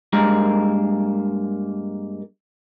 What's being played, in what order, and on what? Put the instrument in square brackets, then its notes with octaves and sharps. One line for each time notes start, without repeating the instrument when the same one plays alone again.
[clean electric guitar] G2 G#3 A#3 A#4